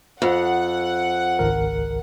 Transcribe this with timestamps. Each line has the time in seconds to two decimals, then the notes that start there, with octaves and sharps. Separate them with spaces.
0.22 F2 F#5
1.39 G#1 C#2 A#4